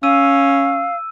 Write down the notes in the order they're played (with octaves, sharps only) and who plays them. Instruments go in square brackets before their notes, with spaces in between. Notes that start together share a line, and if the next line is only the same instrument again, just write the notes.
[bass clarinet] C#4 [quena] F5 [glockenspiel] E6 D#7